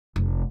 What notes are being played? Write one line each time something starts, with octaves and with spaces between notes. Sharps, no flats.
F1